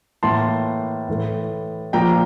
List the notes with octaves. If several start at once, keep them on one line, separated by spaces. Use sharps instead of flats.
A2 E3 A#3 A5 C6
A2 E3 A3
A#2 F3 A#3 G5 A#5